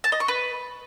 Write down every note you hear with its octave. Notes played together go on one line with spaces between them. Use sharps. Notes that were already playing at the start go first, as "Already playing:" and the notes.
A5
D#5
C#6
B4